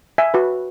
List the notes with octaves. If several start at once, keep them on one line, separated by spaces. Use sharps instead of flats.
E5 G#5
F#4 B4